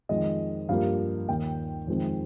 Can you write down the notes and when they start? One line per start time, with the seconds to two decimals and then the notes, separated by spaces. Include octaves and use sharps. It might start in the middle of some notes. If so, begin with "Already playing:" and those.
0.09 F2 D#3 G#3 D#5
0.69 G2 F3 A#3 F5
1.29 D#2 D#3 A#3 G5
1.88 F2 D#3 G#3 C4